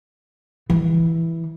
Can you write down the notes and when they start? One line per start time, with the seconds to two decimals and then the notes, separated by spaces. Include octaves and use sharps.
0.70 E3